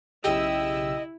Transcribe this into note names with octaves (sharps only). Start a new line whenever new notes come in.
B1 C#3 E4 G4 D#5 E6